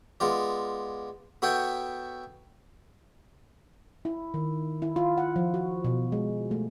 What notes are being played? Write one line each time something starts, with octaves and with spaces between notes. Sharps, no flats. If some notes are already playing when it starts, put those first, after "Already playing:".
G#3 B3 F4 D5
B3 F#4 A4 C#5 E5 G5
E4
D#3
E4
F4
F#5
F3
F#4
B2
G#3
A3